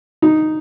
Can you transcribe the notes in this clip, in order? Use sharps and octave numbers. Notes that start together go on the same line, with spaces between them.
D#4